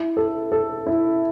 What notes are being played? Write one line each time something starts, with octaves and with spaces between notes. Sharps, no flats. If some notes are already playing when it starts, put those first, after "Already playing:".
Already playing: E4
A4
A4
E4